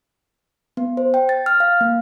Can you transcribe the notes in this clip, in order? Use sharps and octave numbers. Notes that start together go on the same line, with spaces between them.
B3
C5
G5
A6
F6
F5
A#3